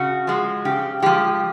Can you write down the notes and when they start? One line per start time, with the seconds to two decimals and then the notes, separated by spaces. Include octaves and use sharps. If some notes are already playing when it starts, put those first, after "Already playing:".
Already playing: C#3 F#4
0.27 F3 G#3
0.65 C#3 G4
1.02 F3 G#3 G4